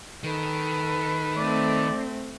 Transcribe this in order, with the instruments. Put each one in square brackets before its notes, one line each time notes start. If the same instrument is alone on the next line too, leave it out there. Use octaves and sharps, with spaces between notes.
[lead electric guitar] D#3 [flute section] A4 B4
[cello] A3 C4 [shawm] D5